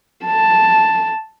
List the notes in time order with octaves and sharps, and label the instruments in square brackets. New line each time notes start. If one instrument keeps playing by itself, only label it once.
[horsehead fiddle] A5